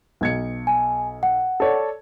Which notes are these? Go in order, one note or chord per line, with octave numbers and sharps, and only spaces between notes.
B1 G#6 C#7
G#5
F#5
A4 C#5 D5